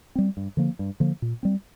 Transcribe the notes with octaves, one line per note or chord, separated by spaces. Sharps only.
G3 C4
G2
D3 F3 A#3
G2
D3 F3 A#3
A#2
G3 C4